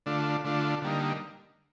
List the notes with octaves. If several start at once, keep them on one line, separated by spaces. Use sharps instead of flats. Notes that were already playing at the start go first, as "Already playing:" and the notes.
D3 A3 D4 F4
D3 A3 D4 F4
D3 G3 A#3 D#4